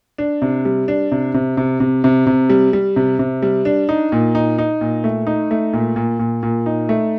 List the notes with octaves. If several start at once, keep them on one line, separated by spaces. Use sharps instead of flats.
D4
C3
G3
D4
C3
C3
C3
C3
C3
C3
G3
G3
C3
C3
G3
D4
D#4
A#2
D#4
D#4
A#2
A3
D#4
A3
A#2
A#2
A#2
A#2
D#4
A3